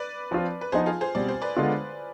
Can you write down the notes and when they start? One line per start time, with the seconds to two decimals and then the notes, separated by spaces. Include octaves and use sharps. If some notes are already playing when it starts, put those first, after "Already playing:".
Already playing: B4 D5
0.31 F3 C4 F4
0.61 B4
0.72 F3 B3 D#4 G#4 C5
0.86 F4 G#4
1.01 G#4 C5
1.15 B2 G3 C4 D5
1.28 C5
1.42 B4 D5
1.57 D3 G#3 B3 F4